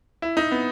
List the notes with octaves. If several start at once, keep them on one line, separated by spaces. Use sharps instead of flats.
E4
D#4
B3